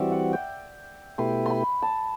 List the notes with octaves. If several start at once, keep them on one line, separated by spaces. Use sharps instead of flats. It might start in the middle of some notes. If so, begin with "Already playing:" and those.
Already playing: E3 G3 C4 F#4 D5 E5
F#5
G5
B2 A3 E4 G4 B4 C6
B5 C6
A5